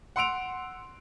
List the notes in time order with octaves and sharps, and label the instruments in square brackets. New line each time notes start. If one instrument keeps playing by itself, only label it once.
[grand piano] F#5 C6 E6 D7 F7